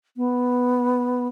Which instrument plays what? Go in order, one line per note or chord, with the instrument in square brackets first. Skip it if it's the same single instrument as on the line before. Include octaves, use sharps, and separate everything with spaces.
[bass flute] B3